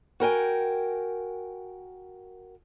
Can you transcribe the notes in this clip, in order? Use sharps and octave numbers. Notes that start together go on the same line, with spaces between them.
F#4 A#4 G5 G#5